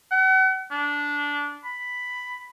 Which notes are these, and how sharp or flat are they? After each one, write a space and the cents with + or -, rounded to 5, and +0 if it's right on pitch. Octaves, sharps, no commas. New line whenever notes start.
F#5 +40
D4 -15
B5 +5